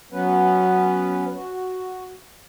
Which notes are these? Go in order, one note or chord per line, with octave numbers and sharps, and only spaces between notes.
F#3 B3 C#4 B4
F#4